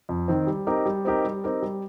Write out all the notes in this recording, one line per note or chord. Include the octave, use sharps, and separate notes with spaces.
F2
D#3 C4
G3
C4 D#4 G4 A#4
G3
C4 D#4 G4 A#4
G3
C4 D#4 G4 A#4
G3